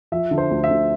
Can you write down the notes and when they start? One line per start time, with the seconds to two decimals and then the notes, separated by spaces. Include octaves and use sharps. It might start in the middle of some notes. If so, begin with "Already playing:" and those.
0.12 F3 E5
0.31 D3
0.38 C5
0.51 D2
0.64 E5
0.70 D2